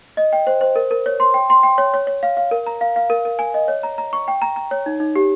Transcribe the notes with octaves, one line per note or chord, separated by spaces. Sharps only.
D#5
G5
C5
C5
A#4
A#4
C#5
C6
G5
C6
G5
C#5
C#5
C#5
F5
F5
A#4
A#5
F5
F5
A#4
A#4
G#5
D#5
C#5
A#5
A#5
C#6
G5
A#5
A#5
C#5
D#4
D#4
G4